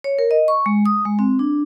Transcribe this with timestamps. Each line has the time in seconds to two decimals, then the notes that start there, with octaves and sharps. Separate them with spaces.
0.04 C#5
0.19 A#4
0.31 D#5
0.48 C#6
0.66 G#3
0.86 D#6
1.05 G#3
1.19 C4
1.39 D4